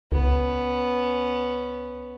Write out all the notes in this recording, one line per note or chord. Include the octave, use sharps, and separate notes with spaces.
C#2 B3 C#4